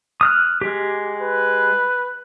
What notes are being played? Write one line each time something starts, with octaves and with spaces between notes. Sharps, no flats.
D#6 F6 F#6
G#3 G4
B4